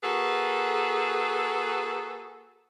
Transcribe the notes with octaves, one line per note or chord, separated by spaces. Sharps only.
A#3 F#4 G#4 A4 B4